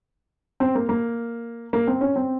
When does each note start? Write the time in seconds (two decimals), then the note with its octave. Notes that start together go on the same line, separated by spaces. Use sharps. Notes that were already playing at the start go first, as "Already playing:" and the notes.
0.60 C4
0.75 A#3
0.89 A#3
1.73 A#3
1.87 C4
2.01 C#4
2.16 C4